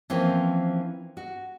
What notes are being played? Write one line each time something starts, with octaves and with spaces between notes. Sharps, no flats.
E3 F3 A#3 C4 C#4
F#4